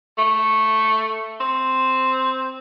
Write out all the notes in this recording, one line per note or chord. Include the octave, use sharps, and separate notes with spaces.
A3
C4